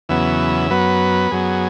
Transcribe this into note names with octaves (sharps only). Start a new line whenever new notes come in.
E2 C#3 F#3 B3 E5
F#2 F#3 B3 B4
F#2 F#3 B3 G#4